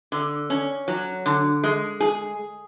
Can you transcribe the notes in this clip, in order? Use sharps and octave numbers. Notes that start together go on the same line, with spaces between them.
D3
C#4
F#3
D3
G#3
G#4